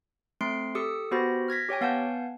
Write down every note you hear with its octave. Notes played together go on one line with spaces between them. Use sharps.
A3 C4 C6 C7 D7
G4 A4 D#6 E6 C#7
B3 F#4 G4 C5 B5 A#6
F6 G#6 A#6 B6
G4 C#5 G5 G#5
B3 F5 F#5 G#5 A5 G6